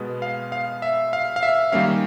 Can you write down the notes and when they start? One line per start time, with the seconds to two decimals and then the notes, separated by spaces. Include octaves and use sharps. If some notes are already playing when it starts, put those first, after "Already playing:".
Already playing: B2 G#3 B3
0.22 F5
0.52 F5
0.82 E5
1.13 F5
1.36 F5
1.43 E5
1.72 D#3 G3 A#3 C#4 F5